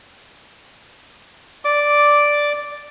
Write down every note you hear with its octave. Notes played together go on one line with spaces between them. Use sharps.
D5 D6